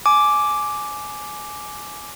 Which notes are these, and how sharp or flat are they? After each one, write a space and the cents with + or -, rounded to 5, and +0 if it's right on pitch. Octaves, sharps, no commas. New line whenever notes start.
G#5 +20 D6 +0